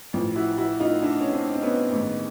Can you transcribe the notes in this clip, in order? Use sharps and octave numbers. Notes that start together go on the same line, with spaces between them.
A1 A2 F3
E4 F#4
E4 F#4
D#4 F4
D4 E4
C#4
C4 D4
C4
B3 C#4
A1 G#2 D#3